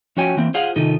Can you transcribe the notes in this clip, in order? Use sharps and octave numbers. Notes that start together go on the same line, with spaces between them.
F3 C#4 F#4 C#5 G5 G#5
E3 A#3 C4
F4 G#4 C5 F5 F#5
C3 D#3 D#4 F4 A4